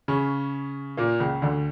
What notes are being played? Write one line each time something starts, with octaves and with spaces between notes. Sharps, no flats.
C#3 C#4
A#2 A#3
C#2 C#3
D2 D3